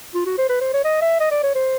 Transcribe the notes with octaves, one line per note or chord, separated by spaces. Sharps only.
F4
F#4
C5
B4
C5
C#5
D#5
E5
D#5
D5
C#5
C5